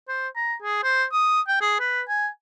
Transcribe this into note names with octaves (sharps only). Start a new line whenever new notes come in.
C5
A#5
G#4
C5
D#6
G5
G#4
B4
G#5